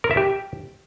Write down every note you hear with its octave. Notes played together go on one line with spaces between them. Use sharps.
A#4
E5
G4